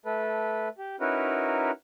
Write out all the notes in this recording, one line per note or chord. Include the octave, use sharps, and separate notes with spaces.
A3 A4 B4
G4
C#4 D#4 E4 F#4 A#4 B4